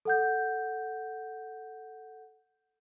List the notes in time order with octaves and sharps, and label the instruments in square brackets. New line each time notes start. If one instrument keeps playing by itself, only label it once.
[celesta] A4 F#5 G6